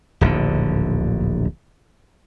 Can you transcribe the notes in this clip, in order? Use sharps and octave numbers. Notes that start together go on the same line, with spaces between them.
D1 A#1 D#2 D3